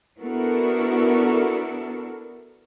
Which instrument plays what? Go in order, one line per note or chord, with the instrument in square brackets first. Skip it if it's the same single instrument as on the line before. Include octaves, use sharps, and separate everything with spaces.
[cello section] B3 D4 E4 F#4 A4 A#4